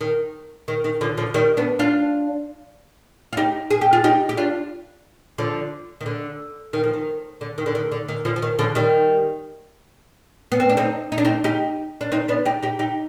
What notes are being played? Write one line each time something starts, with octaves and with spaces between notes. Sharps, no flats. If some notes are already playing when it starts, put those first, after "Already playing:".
D#3
D#3
D#3
D3 F3
D3 F3
D#3 G3
B3 D4
D4 F4
F4
D#4 G4
G#4
G4
F4 G#4
D#4 G4
G4
D4 F4
D3 F3
D#3
D3
D#3
F3
D#3
D3
D#3
D3
D#3
D3
D#3
D3 F3
F3
D#3
D3 F3
D#3 G3
B3
C4
D4
C4 D#4
D#4
D4
C4 D#4
D#4 G4
D4
C4 D#4
B3 D4
D#4 G4
D#4 G4
D#4 G4